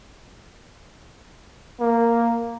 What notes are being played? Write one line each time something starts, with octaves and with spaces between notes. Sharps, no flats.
A#3